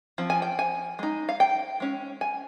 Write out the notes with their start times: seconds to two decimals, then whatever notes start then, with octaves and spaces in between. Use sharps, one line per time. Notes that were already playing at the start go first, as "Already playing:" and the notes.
0.18 F3 C4
0.30 G#5
0.42 G5
0.59 G#5
0.99 G#3 D#4
1.29 F5
1.40 G5
1.80 G#3 C#4
2.21 G#5